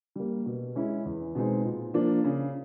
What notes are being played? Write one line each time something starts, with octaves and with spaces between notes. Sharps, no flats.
G3 A#3
B2
G#3 C#4 E4
E2
B2 G#3 C4 D#4
A#2
F3 A#3 D4
C#3